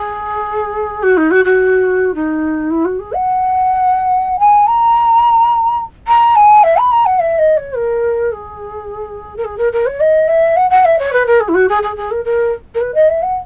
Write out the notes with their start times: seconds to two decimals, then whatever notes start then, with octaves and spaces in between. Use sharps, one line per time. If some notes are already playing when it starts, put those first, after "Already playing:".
Already playing: G#4
1.02 F#4
1.17 D#4
1.30 F#4
1.44 F#4
2.14 D#4
2.70 E4
2.84 F#4
2.99 G#4
3.13 F#5
4.39 G#5
4.66 A#5
6.07 A#5
6.35 G#5
6.63 E5
6.77 B5
6.91 A#5
7.05 F#5
7.19 E5
7.38 D#5
7.56 C#5
7.76 A#4
8.32 G#4
9.36 A#4
9.44 G#4
9.57 A#4
9.72 A#4
9.86 C#5
10.00 D#5
10.28 E5
10.56 F#5
10.70 F#5
10.84 E5
10.98 C#5
11.12 B4
11.26 A#4
11.40 G#4
11.48 E4
11.54 F#4
11.68 G#4
11.82 G#4
11.96 G#4
12.10 A#4
12.24 A#4
12.74 A#4
12.80 B4
12.94 D#5
13.09 E5
13.22 F#5